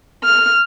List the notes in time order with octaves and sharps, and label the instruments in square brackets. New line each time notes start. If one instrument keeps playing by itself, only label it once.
[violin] F6